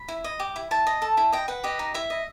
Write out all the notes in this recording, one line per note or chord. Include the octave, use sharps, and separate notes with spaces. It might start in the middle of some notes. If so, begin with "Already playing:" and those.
Already playing: B5
E4
D#5
G4
E4
E4 A5
D#5
A4
E4
D#5 G5
B4 F#5
G4 D#5
D#4
E4 E5
D#5